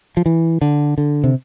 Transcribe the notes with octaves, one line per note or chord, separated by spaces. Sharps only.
F3
E3
D3
D3
C3